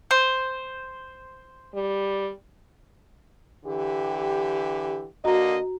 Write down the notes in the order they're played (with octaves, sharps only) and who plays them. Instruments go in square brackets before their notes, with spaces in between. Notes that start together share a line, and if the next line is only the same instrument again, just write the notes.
[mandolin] C5
[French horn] G3
[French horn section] D3 E3 G4
[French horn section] D3 A#3 D#5 [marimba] F#4 A#5